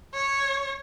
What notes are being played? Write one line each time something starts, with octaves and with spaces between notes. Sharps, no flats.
C#5